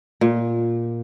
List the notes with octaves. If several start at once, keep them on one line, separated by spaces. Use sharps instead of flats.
A#2